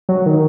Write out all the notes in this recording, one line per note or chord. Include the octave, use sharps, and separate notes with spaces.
F#3
D#3